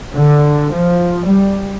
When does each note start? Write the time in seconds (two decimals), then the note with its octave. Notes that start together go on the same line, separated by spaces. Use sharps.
0.14 D3
0.73 F3
1.25 G3